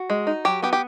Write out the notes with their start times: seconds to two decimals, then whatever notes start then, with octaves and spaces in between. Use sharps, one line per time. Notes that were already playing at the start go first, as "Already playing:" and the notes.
Already playing: F#4
0.10 G#3
0.27 D#4
0.45 F#3 G4
0.62 B3 G4
0.73 G4